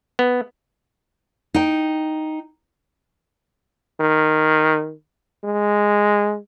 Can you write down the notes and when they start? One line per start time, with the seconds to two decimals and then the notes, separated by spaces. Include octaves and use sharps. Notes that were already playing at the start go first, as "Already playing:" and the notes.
0.19 B3
1.54 D#4 G5
4.01 D#3
5.44 G#3